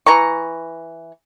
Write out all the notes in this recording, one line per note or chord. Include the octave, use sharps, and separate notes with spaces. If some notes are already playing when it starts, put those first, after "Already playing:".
E3 A#5 C#6